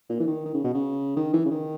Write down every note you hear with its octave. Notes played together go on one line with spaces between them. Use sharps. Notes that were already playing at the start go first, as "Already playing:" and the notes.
A#2
E3
D#3
D#3
C#3
B2
C#3
D#3
E3
C#3
D#3